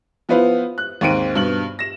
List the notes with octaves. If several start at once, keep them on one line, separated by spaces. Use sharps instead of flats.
F3 B3 E4 B4 C5 F5
F#6
D#2 G#2 C4 D7 D#7
G2 B2 F#7
A#6 E7